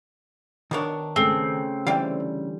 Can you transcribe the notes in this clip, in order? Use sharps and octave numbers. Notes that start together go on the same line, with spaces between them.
B2 D#3 D4 A#4 C#5
C#3 A3 C4
D3 E3 G3 F5 G5